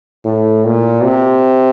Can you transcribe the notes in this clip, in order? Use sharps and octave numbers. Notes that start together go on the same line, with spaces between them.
A2
A#2
C3